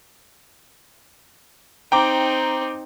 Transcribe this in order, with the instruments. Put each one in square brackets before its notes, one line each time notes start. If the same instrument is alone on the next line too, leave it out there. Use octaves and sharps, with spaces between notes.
[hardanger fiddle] C4 D#4 [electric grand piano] G5 A#5 D6